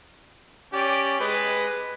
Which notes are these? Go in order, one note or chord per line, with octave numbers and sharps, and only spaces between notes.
C#4 G4 D5
G#3 B4